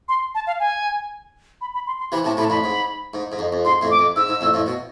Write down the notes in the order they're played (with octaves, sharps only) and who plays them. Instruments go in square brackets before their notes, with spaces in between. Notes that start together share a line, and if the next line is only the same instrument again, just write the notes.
[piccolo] C6
A5
F5
G#5
B5
B5
C6
C6
[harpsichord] C3 E3 [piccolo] B5
[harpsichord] A2 C3 [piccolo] A5
[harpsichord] A2 C3 [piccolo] B5
[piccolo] A5
[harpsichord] F2 A2 [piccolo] B5
[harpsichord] G#2
G#2
G#2
F2
F2
[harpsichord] G#2 [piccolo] C6
[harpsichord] F2 A2
[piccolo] D6
[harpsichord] F2
[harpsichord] G#2 [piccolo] E6
[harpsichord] G#2
F2 A2
F2 A2
B2